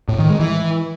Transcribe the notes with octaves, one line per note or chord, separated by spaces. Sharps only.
A2
D#3
G#3
E3